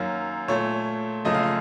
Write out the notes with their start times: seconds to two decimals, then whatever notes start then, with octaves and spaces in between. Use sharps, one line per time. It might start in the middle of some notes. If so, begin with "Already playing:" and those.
Already playing: F#2 D#3 F#3 A#3 F5
0.48 A#2 A3 C#5
1.25 F#2 C#3 F3 A3 D#5
1.34 F5
1.43 D#5